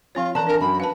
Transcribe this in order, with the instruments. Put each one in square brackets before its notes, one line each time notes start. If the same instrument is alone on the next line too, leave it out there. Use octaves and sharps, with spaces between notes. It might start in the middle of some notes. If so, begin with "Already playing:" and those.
[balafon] F3 C4 C#5 [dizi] F4
[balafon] E3 A4 D5 [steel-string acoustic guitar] A5 [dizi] A#5
[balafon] D4 G#5 [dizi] A#4
[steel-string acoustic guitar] F#2 [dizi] B5
[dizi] B4 [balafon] F5 A5